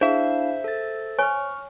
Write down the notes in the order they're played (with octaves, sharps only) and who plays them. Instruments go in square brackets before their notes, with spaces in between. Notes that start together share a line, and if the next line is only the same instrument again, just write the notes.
[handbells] D4 E4 F5 [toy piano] G#4 [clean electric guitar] C5 E5
[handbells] A4 A6
[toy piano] C#5 G#5 [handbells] C#6 F6